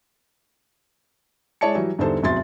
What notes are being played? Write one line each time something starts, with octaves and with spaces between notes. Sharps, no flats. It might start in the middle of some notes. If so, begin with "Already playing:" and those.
G#3 E4 C#5 D5 A5 C#7
E3 F#3 G3
E2 D3 G3 D#4 A4 C5
F1 E2 F#3 E5 C6 A6